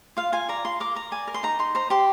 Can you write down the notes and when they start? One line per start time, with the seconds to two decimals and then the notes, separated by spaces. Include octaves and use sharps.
0.17 F4 F5
0.32 F4 G#5
0.49 D5 A#5
0.64 F4 C6
0.80 A#4 D6
0.95 A#4 A#5
1.12 D5 G#5
1.27 A#4
1.34 C6
1.43 D#4 A#5
1.59 D#4 C6
1.75 C5 A#5
1.90 G4 C6